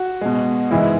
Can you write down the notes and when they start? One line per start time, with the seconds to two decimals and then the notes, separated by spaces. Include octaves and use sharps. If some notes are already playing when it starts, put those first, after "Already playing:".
Already playing: F#4
0.21 B2 G#3
0.71 G#2 E3 G#3 E4